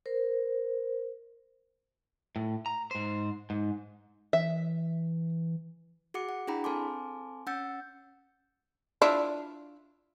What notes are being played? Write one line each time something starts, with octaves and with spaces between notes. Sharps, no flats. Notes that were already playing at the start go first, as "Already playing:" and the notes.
A#4 C5
A2
A#5
G#2 C5
G#2
E3 E5
F#4 G#4 F#5 D6 C#7
F#5
D4 E4 G#4 G5 A#5 B5
C4 A4 G#5 A5 C6 D6
C#4 F#5 E6 G6 A6 C#7
D4 E4 F4